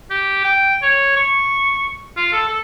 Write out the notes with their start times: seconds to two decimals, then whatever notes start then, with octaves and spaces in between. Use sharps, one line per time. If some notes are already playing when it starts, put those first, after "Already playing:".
0.11 G4
0.44 G5
0.82 C#5
1.17 C#6
2.17 F4
2.33 A4
2.49 A4